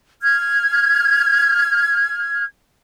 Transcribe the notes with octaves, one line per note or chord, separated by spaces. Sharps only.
F6 G#6